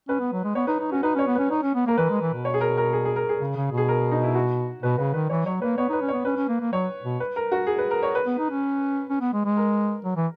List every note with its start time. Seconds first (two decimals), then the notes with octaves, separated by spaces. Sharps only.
0.08 C#4 B4
0.20 B3
0.32 F#3
0.44 G#3
0.55 B3 C#5
0.67 D#4 B4
0.80 D#4
0.91 C#4 F#4
1.03 D#4 B4
1.15 C#4 C#5
1.27 B3
1.35 C#4 B4
1.50 D#4 C#5
1.63 C#4
1.74 B3
1.86 A#3 A#4
1.98 E3 B4
2.10 G#3
2.22 E3
2.34 B2
2.45 C#5
2.54 G#4
2.61 A#4
2.77 A#4
2.93 G#4
3.05 G#4
3.16 A#4
3.29 G#4
3.40 C#3
3.56 C#3
3.72 B2
3.77 G#4
3.88 A#4
4.11 D#4
4.23 E4
4.35 F#4
4.82 B2 B4
4.98 C#3 B4
5.14 D#3 B4
5.30 E3 C#5
5.46 F#3 C#5
5.62 A#3 B4
5.78 B3 C#5
5.89 D#4 B4
6.02 C#4
6.08 B3 C#5
6.25 C#4 B4
6.37 C#4
6.49 A#3
6.60 A#3
6.72 F#3 C#5
7.04 B2
7.20 B4
7.36 A#4
7.52 F#4
7.67 G#4
7.78 B4
7.91 A#4
8.03 C#5
8.15 B4
8.26 B3
8.38 D#4
8.50 C#4
9.09 C#4
9.21 B3
9.33 G#3
9.45 G#3
9.57 A#4
10.04 F#3
10.16 E3